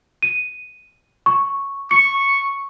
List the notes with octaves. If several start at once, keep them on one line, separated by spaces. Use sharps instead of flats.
D#7
C#6
C#6 C#7